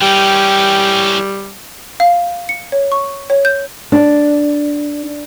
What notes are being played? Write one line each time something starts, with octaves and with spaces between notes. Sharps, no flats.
E3 G3 C#4 G5
F5
C#7
C#5
C#6
C#5
G6
D4